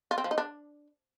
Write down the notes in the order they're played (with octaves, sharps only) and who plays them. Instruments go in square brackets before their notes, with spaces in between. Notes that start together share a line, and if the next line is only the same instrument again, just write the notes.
[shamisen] F4
C4
F3
D#4
D4